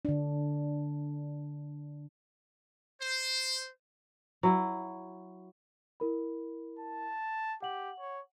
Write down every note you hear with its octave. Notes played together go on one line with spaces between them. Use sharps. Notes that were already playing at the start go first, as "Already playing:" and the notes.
D3 D4
C5
F#3 E4
E4 A#4 B5
A5
G4 F#5 F#7
C#5